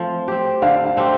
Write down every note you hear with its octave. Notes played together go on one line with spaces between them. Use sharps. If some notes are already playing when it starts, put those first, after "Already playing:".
Already playing: F3 A3 C4 F4
C4 G4
D3 F5
F5
A3 C4 G4